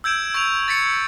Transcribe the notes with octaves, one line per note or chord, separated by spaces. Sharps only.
E6 G6 G#6 D7 E7
C#6 G#6 D7 F7
A6 B6 C#7